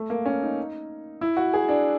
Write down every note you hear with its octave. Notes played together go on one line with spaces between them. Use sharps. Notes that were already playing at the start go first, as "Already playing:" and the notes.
Already playing: A3
A#3
C#4
D#4
E4
F#4
G#4
D4